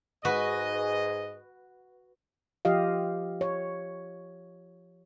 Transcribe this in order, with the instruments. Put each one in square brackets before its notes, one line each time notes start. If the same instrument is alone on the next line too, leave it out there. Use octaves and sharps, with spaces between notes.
[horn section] G#2 G#4 D#5 [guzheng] F#4 B4
[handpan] F3 F4 G4 D#5 F5
C#5